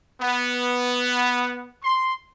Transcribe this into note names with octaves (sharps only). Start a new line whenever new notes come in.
B3
C6